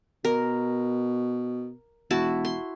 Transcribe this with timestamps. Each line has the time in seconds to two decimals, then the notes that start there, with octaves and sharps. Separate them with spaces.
0.25 B2 A#4
2.11 E1 E4 F#4 A5
2.45 C6